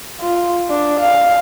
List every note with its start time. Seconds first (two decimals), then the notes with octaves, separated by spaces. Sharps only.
0.21 F4
0.70 D4
1.00 F5